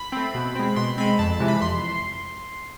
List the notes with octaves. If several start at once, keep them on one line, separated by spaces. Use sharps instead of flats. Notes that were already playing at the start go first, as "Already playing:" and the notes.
Already playing: B5
A3 C4
B2
G#3 C4
B2 C6
G#3 C4 B5
F2 A5
A5
C3 E3 G#3
B5
F2 C6